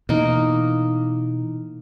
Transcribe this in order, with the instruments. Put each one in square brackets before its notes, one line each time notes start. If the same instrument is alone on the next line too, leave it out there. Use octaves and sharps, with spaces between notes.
[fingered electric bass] B2 E3 [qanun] A#3 D#4